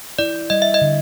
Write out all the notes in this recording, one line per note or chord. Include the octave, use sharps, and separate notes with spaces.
E4 D5
G3 D#5
E5
D#5
D3